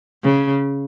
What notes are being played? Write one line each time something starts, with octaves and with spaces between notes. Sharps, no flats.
C#3